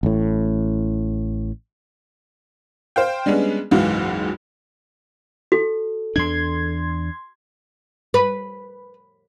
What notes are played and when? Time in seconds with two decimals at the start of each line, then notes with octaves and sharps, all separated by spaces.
0.03 A1 A2
2.96 C5 F5 G5
3.26 G3 G#3 B3 C#4 D4
3.71 F#1 C#2 G#2 E3 F#4 F5
5.52 F#4 A4
6.16 E2 D4 C6 G#6
8.14 B4